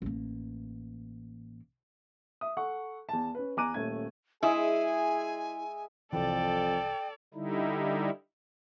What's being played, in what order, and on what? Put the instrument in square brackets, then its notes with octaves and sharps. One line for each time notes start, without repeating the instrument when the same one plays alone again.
[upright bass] A1 A#3
[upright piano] E5 D#6
A4 F#5 C#6
E2 A5
C#4 B4
E2 G#5 A#5 D6 F#6 D#7
D#1 A3 C#4 G#6
[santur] G#3 E5 D#6 [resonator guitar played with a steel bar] E4 [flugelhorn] G#4 [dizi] G#5
[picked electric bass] C2 E3 [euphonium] F2 [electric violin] A4 D5 [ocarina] G5
[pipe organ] D3 G3 D#4 E4